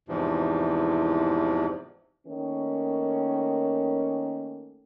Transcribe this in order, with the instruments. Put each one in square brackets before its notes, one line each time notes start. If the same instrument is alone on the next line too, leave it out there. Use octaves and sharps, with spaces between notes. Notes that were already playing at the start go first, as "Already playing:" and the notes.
[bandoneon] E2 G#2 C3 E3 F3
[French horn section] D#3 A3 A#3 C#4